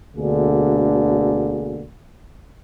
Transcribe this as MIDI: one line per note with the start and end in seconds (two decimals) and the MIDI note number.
0.16 1.84 38
0.16 1.84 47
0.16 1.84 50
0.16 1.84 58
0.16 1.84 68